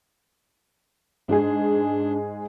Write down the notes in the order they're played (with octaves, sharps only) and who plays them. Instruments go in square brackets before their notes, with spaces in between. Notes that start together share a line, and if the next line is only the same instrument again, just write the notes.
[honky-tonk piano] G#2 G#3 G#4 [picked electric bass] D4